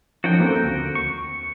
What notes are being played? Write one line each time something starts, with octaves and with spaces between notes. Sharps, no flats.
F3 C#4 D#4 F#4 A#4 G5
A#3 C4 A4
D2
C#6